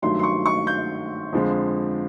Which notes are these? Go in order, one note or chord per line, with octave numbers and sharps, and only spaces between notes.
G2 D#3 F#3 A3 C6
C6
C#6
C#6
G6
F2 D3 F3 G#3